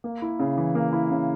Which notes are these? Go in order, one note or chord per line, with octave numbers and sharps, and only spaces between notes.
A#3
E4
C#3
E3
A#3
E4
C#3